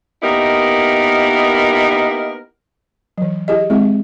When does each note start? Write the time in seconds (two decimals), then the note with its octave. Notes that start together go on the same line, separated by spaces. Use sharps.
0.22 A#3 B3 D#4 E4 G4 A#4
3.18 E3 F#3
3.48 E4 G4 G#4 D#5
3.70 G#3 C4 E4 G#4